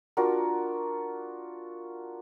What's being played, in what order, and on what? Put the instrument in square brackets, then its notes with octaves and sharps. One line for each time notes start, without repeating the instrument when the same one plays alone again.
[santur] D4 F4 F#4 A#4